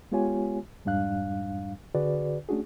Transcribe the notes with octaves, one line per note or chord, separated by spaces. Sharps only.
G#3 B3 F4 G4 C#5 G#5
F2 G#2 G3 D4 F5 F#6
D3 F#4 G#4 B4 D5
A3 C#4 D4 F#4 G#4